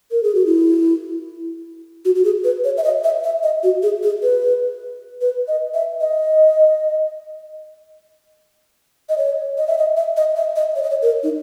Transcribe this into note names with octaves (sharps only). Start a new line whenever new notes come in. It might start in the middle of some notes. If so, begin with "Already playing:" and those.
A#4
G#4
F#4
E4
F#4
F#4
G#4
B4
C#5
E5
D#5
E5
E5
D#5
F#4
G#4
G#4
B4
B4
D#5
E5
D#5
D#5
C#5
D#5
E5
D#5
E5
D#5
E5
D#5
C#5
D#5
C#5
A#4
D#4